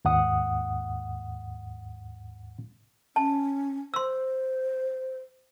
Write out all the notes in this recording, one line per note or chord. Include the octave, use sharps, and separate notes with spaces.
D#2 G#2 F#5 D#6
C#4 A5
C5 C6 E6